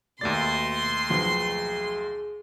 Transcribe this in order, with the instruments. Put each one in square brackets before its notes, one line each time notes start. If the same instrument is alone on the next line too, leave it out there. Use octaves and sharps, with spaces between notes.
[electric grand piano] D#2 A3 A6 [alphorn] B2 [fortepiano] D5 [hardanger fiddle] C6
[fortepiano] B1 F3 F#4 [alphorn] G#4